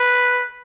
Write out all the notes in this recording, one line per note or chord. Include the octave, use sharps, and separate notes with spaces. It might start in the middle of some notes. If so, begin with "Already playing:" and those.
Already playing: B4